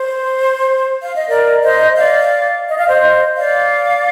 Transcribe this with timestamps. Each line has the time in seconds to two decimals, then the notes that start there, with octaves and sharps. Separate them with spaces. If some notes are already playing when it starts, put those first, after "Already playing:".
Already playing: C5
1.02 F5
1.16 D#5
1.28 A#4 D5
1.63 C5 D#5
1.97 D5 F5
2.67 D#5
2.77 F5
2.86 C5 D#5
3.37 D5 F5